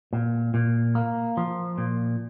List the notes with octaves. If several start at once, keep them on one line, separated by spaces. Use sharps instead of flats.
A#2
A#2
A#3
F3
A#2